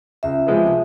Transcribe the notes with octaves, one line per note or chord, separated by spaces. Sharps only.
C#2 E5
C3 F3 G#3 B3